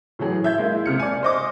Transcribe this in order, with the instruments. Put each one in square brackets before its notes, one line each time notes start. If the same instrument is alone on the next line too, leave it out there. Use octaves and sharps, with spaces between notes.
[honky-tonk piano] A2 E3 F#3 G#4
E5 G6 G#6
G#3 A#3 E4
C3 F6 C#7
D5 G#5
C5 D#5 D6